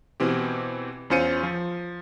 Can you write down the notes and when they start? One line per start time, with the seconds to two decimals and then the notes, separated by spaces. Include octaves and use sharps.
0.20 B2 E3 C4 G4
1.10 E2 C#4 F4 C5 C#7 D#7
1.43 F3